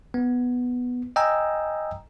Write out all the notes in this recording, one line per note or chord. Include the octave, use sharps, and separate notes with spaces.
B3
D#5 G5 G#5 A#5 E6